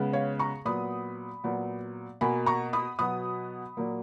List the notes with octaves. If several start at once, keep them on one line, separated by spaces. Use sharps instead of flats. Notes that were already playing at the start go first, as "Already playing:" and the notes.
Already playing: C#3 G#3 B3
C#5 F5
A#5 C#6
A#2 F#3 B3 B5 D#6
A#2 F#3 B3
B2 A#3 G#5 B5
A#5 C#6
B5 D#6
B2 F#3 B3 B5 D#6
A#2 F#3 A#3